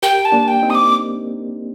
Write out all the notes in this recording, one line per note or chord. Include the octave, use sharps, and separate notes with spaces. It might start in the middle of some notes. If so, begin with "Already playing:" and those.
G4 A#4 G5
A5
A#3 D4
G5
C4 D#4
D#6
D6